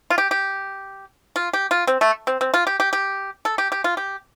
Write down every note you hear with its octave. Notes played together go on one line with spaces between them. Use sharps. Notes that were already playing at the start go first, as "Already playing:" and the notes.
F4
G4
G4
F4
G4
F4
C4
A3
C4
C4
F4
G4
G4
G4
A4
G4
G4
F4
G4